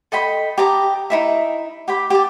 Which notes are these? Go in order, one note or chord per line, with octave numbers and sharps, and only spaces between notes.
A4 D#5 G5 B5
G4 A5 A#5 D#6
D#4 E4 E5
G4 G5 B5
G4 A5